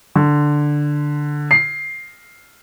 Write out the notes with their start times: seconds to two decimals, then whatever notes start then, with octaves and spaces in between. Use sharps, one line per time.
0.16 D3
1.51 C7